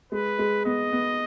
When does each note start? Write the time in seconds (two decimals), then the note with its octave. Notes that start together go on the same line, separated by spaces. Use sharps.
0.12 G#3 B4
0.39 G#3
0.66 B3 D#5
0.93 B3